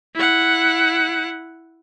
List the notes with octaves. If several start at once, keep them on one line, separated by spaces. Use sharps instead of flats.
E4 F#5